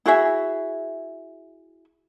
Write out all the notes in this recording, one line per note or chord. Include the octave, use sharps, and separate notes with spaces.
E4 F#4 G#4 E5